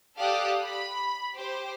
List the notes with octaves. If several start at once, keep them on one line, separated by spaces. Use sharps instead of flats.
G4 A4 D5 F5 D#6 F#6
B5
G4 C5